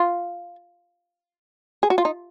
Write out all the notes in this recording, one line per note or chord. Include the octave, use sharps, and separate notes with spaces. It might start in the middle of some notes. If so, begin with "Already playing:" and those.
Already playing: F4
G#4
F#4
F4
D#4